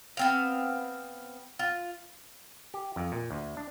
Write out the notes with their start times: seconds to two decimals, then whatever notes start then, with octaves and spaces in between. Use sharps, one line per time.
0.17 B3 C4 F5
1.59 F4
2.74 G4
2.96 F2
3.12 A#2
3.31 D2
3.57 D4